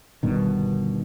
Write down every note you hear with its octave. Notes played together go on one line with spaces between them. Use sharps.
G1 G2 B2 D#3